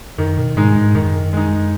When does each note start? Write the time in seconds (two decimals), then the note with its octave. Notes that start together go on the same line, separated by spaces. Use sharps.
0.18 F#2 D#3
0.37 B2
0.56 G#2 G#3 D#4
0.76 G#2
0.95 F#2 D#3
1.33 G#3 D#4